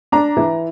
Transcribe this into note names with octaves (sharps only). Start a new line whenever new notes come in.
D4 A#5
E3